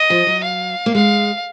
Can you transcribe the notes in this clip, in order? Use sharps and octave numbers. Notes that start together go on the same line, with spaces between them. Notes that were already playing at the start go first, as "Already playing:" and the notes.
Already playing: D#5
F3
F#3
F5
A#3
G#3 F5